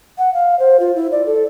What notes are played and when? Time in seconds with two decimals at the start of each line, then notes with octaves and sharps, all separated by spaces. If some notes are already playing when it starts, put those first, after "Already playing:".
0.18 F#5
0.34 F5
0.59 C5
0.80 F4
0.96 E4
1.12 D5
1.26 A4